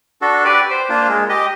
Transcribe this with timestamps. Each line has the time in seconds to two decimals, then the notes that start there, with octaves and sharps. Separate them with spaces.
0.22 D4 F#4 A4
0.44 G4 B4 D5
0.70 C5
0.89 A#3 D4 F4
1.09 G#3
1.29 G4 D#5